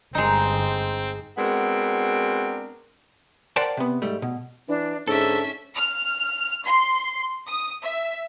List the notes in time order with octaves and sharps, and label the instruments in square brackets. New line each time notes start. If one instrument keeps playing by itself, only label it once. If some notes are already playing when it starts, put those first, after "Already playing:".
[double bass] G1 [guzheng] G#3 D#4 [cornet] C4
[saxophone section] G#3 B3 C4 D4 F#4 A#4
[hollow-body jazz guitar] A#4 C5 D5 F#5 G5 A5
C3 B3
G#2 G3 A3
B2
[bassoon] E3 [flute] D4
[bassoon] G#2 [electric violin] C#4 E5 [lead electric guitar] D4 A4 [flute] E6
[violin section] F6
C6
D#6
E5